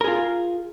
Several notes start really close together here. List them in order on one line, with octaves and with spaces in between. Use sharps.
A#4 G#4 F4